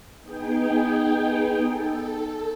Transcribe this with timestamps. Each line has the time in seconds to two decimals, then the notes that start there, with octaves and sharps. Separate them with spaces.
0.23 B3 D#4 G#4 G5
1.64 A4